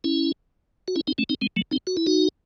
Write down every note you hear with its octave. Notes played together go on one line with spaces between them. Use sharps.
C#4 E4
F#4
C#4 E4
C4 D#4
A3 C#4
C4 D#4
G#3 C4
F#3 A3
C4 D#4
F#4
E4
D#4 F#4